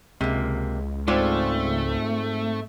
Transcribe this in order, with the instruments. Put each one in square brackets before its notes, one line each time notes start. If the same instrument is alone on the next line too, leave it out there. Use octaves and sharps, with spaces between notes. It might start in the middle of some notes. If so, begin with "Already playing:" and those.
[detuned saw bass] C#2 [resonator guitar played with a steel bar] C3 A#3 [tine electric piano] G#3
[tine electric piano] G#2 C4 [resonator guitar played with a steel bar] G#3 F4 D5 [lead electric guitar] A3